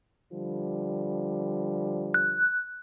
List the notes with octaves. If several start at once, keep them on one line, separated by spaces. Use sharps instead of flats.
D3 F3 G3
F#6